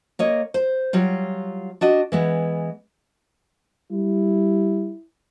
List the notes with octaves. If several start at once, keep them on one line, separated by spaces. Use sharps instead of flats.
A#3 C#5 D#5
C5
F#3 G3 F4
D4 F#4 D#5
E3 G#3 B3
G3 E4